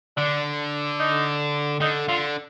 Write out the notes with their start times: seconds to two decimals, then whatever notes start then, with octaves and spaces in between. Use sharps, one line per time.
0.17 D3 D4
1.00 D#4
1.81 D3 D#4
2.08 D3 F4